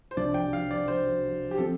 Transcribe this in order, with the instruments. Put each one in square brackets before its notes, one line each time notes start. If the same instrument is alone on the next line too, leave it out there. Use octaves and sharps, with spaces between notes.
[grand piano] C5
[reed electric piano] C2 C3 F3 D4 [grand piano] D5
[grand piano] G5
F5
D5
C5
G4
[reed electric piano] F3 C4 [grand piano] A4